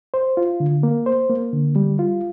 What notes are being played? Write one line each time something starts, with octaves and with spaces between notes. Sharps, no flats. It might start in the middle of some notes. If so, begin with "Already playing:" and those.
C5
F4
D3
A#3
C5
A#3
D3
G3
F4